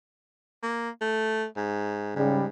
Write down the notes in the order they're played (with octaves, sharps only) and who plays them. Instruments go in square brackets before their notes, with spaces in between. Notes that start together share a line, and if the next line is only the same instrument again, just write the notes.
[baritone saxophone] A#3
A3
G#2
[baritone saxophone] G#2 [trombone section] C#3 G3